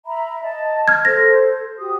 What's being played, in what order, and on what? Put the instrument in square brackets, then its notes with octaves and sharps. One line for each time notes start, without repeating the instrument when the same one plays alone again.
[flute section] E5 A#5 B5
D#5 A5
[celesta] F6 G#6
[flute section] A4 C5 [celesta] A#6
[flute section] F#4 G4 D#6